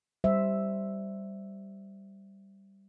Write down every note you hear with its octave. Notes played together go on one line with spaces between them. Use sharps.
G3 C5 E5